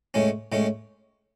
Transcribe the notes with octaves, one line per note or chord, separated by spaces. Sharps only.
A2 G#3 C#4
A2 G#3 C#4